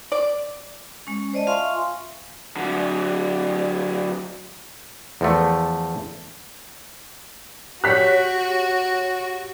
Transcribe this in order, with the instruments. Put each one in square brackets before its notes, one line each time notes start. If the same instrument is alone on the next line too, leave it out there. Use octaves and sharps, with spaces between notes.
[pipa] D5
[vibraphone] G#3 C#4
C5 D5 D#5 A5
F4 E5 F5 G#5 C6 C#6
[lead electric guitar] D3 F#3
[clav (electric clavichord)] E2 F3 A3
[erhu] F#4 [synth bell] G4 C#5 [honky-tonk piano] F#6 B6